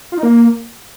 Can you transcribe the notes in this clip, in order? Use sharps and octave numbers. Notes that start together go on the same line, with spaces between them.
F4
D#4
A#3